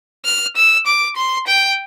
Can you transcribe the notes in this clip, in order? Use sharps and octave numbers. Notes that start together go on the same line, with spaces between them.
F6
E6
D6
C6
G5